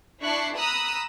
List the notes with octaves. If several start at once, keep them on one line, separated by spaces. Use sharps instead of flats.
D4 E4 C#6 F#6 C7
A#5 B5 D#6 E6 F#6